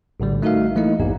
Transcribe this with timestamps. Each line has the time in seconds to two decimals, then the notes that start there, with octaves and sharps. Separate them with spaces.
0.20 A#1 A2 D3 G3
0.42 A3 D#4 F#4 A#4 E5 F5
0.76 E3 A3 A#3 D#4 E4 D#5
0.99 A1 E2 G#2 B3 G4